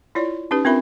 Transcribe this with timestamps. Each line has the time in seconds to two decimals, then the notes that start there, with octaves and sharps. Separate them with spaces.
0.15 E4 F4 C#5 D5
0.51 C#4 D#4 G4 B4
0.65 C4 D4 F4 A#4 E5 B5